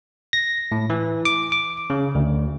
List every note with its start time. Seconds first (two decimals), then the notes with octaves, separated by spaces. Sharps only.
0.33 A#6
0.72 A2
0.90 E3
1.25 D6
1.52 D6
1.90 C#3
2.15 D2